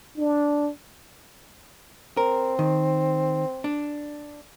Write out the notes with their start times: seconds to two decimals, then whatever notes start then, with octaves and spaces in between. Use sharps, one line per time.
0.18 D4
2.17 C4 A#4
2.59 D#3
3.64 D4